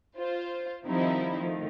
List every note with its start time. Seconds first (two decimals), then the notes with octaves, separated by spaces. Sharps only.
0.18 F4 C5
0.86 D#3 F3 G3 C4 D#4 E4
1.37 D#3 F3 A3